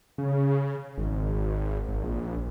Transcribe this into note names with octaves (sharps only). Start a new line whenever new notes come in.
C#3
G#1
G#1
A#1